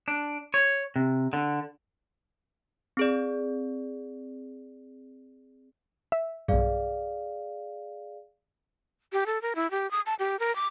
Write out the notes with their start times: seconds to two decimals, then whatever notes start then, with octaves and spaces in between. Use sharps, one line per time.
0.08 D4
0.54 C#5
0.96 C3
1.33 D3
2.97 C4 G#4 D5
6.12 E5
6.48 B1 G2 G#4 D5 F5
9.13 G4
9.26 A4
9.42 A#4
9.55 E4
9.71 G4
9.91 D#6
10.06 A5
10.19 G4
10.39 A#4
10.56 D6